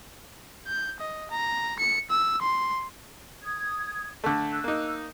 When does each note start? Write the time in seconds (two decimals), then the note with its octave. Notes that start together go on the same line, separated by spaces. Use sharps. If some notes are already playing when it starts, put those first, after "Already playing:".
0.67 G6
1.00 D#5
1.31 A#5
1.79 C#7
2.10 E6
2.42 C6
3.42 D#6 G#6
4.24 D3 A3
4.51 E6 F#6
4.64 A#3 D#4